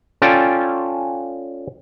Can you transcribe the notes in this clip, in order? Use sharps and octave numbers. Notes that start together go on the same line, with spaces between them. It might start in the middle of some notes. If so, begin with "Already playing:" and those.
C#4 F4 A4 D5 G5 G#5